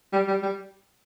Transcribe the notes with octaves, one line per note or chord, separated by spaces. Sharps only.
G3
G3
G3